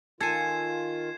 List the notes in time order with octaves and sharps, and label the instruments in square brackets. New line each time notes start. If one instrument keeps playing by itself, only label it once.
[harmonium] D#3 F4 [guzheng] A4 G#5 [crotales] G#6 C7 E7